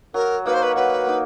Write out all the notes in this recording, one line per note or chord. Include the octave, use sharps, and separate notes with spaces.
F#3 A#4
A#3 D#4 F#4 B4
C5
B4
F#3 B4
A#3 D#4